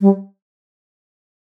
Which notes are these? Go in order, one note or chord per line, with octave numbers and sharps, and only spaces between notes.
G3